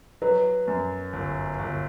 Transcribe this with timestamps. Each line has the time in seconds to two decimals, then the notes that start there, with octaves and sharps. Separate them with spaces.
0.22 F#3 B4
0.68 F#2
1.13 G1
1.59 G1